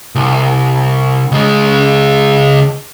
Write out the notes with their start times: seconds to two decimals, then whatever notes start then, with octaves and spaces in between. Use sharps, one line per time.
0.15 C2
1.32 C#2 G#3